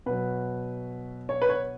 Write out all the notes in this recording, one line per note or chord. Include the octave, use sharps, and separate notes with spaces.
B2 F#3 B4
C#5
B4
C#5